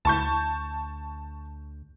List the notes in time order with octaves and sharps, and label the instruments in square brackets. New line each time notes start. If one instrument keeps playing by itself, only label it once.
[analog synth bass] D2 [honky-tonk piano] A5 C#6 G6